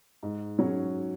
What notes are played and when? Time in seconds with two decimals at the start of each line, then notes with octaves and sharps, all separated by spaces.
0.23 G#2
0.59 F#3 C#4